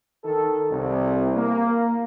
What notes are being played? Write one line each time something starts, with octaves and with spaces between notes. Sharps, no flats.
D#3 A4
C2
A#3